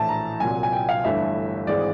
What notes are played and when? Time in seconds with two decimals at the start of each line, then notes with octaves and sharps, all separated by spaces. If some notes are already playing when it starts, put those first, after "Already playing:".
Already playing: A#1 A2 E3 A3 A5
0.09 A#5
0.40 C2 A#2 F#3 G#5
0.63 G#5
0.73 G5
0.89 F5
1.04 G1 G2 E3 A3 E5
1.67 G#1 G#2 E3 G#3 D5